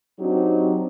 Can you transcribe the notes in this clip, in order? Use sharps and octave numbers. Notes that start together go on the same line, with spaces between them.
F#3 C4 D4 D#4 F#4 G4